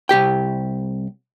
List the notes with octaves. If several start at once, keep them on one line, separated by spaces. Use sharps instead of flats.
C2 G4 G5